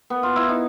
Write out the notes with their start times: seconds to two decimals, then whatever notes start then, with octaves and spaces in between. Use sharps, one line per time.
0.10 B3
0.23 F4
0.36 E4
0.49 D#4